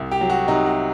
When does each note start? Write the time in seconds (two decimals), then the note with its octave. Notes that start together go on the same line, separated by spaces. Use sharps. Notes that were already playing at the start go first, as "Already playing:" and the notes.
Already playing: C2
0.11 G4
0.21 F#3
0.30 F#4
0.48 C3 D#4
0.66 F#4